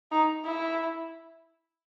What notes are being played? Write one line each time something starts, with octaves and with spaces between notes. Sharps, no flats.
D#4
E4